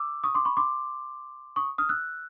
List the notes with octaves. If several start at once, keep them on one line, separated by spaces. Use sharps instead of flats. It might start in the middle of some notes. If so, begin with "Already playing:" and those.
Already playing: D6 E6
C#6 D#6
C6 D6
B5 C#6
C6 D6
C#6 D#6
D#6 F6
E6 F#6